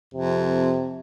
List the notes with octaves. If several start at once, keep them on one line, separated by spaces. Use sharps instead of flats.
F2 C3